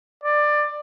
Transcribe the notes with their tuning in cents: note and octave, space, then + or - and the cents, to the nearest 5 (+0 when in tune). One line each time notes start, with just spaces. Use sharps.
D5 +20